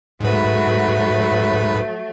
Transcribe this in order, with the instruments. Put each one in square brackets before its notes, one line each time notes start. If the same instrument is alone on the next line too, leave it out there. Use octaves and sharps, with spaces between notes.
[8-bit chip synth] G#2 B4 [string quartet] F#3 A3